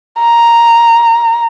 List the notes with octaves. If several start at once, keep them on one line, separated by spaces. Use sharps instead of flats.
A#5